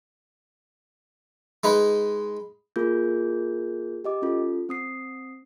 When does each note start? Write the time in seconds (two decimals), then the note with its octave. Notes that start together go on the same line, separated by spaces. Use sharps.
1.63 G#3 D#4 B4
2.76 A#3 F4 G#4 A#4 G6
4.05 G4 D#5 D6
4.22 C#4 F4 A4
4.69 C4 D#6 C7